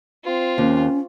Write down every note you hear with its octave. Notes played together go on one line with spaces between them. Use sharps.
C4 F4
D#2 C#4